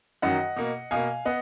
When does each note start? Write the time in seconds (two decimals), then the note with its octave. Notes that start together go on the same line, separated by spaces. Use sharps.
0.22 F#2 D#3 F#3 D#5 F#5
0.56 B2 A#3
0.91 B2 A#3 F5 G#5
1.25 B3 D#5 F#5